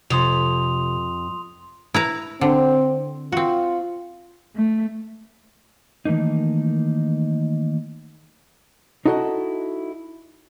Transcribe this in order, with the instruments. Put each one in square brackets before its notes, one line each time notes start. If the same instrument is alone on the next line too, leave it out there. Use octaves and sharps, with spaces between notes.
[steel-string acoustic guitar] F2 [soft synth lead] C3 [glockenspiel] C6 D#6 F7
[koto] E4 B4 A#5
[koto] D3 [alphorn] C4
[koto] C4 F#4 [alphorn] F4
[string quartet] A3
[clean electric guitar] D#3 E3 A3 A#3 D#4
[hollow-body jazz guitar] D#4 E4 F#4 A4 C#5 D#5